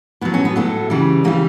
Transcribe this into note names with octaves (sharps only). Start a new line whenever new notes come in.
A2 F#3 B3
C#4
B3
A2 F#3 A3
C#3 E3 G3
C#3 E3 G3 A#3